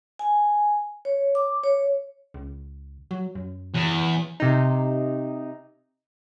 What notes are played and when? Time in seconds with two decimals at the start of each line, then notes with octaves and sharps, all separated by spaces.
0.19 G#5
1.05 C#5
1.35 D6
1.64 C#5
2.34 C#2
3.11 F#3
3.35 F#2
3.74 E2
4.40 C3 D#4